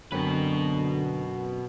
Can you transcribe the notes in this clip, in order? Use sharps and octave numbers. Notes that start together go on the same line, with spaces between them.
F#2 B2 D3 C4 B4